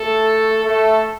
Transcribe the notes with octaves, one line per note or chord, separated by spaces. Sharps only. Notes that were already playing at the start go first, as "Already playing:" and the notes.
Already playing: A3 A4
A3 A4